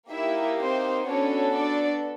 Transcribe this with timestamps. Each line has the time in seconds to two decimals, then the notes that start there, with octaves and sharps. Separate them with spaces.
0.11 A#3 D#4 E4 G4 E5
0.60 C4 C5
1.07 B3 C#4 D4 F#4 A4 C#5
1.55 D4 D5